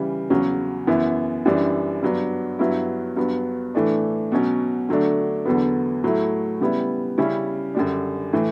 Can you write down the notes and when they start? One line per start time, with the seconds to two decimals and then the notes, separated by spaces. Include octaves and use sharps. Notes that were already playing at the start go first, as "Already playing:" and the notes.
Already playing: C#3 E3 G3
0.30 E2 C#3 F#3 C#4
0.87 F#2 E3 B3 E4
1.45 F#2 E3 G3 D4
2.03 G2 F#3 B3 D4
2.59 G2 F#3 B3 E4
3.17 G2 F#3 B3
3.75 A2 E3 A3 D4
4.32 B2 F#3 C#4
4.89 D3 F#3 A3 D4
5.45 E2 D3 F#3 B3
6.04 A2 F#3 A3 E4
6.60 C#3 G3 B3 E4
7.18 C#3 G3 C#4 E4
7.75 F#2 D3 G3 D4
8.33 A2 E3 A3